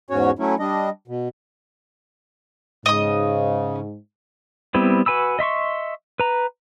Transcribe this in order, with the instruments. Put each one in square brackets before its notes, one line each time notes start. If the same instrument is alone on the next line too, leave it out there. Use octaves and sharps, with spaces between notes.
[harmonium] E2 G#2 C#4 F#4 C#5
F#3 A3 C#4 E4
G3 D4 D#5
B2
[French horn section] G#2 [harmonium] C#3 [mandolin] D#5 D#6
[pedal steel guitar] G3 B3 C4 E4
F#4 B4 G#5 B5 E6
D#5 E5 C6 C#6
B4 A#5